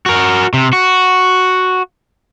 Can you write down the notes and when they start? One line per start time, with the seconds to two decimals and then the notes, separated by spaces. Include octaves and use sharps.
0.06 F#4 A#4
0.53 C3
0.73 F#4